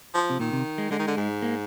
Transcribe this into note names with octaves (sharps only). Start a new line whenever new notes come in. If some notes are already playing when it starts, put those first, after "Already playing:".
F3
C3
A#2 D#3
C3
G#3
D3 G#3
D#3
D3
G#2
A#3